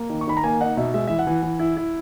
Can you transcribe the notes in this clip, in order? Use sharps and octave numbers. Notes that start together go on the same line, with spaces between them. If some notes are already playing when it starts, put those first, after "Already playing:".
Already playing: A#3
D#3
C#6
D#3 B5
A#5
A#3 G#5
D#4 F#5
B2 E5
G#3 E5
E3 E5
F#5
E3
E3
E4
E4